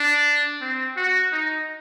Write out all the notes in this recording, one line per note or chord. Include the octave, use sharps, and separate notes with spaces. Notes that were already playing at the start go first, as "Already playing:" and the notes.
Already playing: D4
C4
F#4
D#4